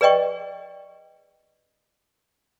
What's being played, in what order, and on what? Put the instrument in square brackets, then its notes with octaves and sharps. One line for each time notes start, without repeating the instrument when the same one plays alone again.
[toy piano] G#4 B4 D5 D#5 G5 C#6